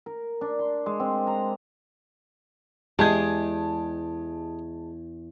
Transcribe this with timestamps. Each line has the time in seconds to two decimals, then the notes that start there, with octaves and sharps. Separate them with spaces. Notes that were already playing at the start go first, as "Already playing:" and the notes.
0.06 A#4
0.41 D4
0.59 C6
0.86 G#3
1.00 C4
1.27 A#5
2.99 E2 G#3 G4 G#4 D#5 A5 G#6